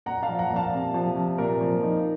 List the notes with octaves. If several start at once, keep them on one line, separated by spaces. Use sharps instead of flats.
A#2 F#5 A#5
F5 A5
F3
F#5 A#5
A#2
F5 A5
C3
F3
C3
A#2 A#4
F3
D#4